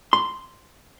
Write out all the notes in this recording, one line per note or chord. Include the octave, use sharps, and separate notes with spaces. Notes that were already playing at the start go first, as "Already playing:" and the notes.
C6